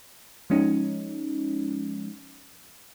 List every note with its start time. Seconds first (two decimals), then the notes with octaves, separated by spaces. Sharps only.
0.50 F3 G#3 C#4 D#4